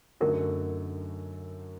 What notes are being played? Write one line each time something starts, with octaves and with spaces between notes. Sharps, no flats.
F#2 D3 A3 D#4 F#4 A#4